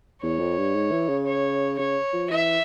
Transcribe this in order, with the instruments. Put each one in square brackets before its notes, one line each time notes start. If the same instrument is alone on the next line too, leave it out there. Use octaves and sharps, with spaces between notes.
[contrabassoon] E2 [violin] C#5
[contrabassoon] F2
G2
G#2
E3
C#3
[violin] C#5
[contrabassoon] C#3 [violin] C#5
[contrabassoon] F3
[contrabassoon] E3 [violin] E5